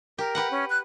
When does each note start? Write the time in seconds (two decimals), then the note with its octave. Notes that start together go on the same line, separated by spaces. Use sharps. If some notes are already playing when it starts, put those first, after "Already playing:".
0.18 G4 A#4
0.35 G4 B4 F#5
0.51 C#4
0.70 F#6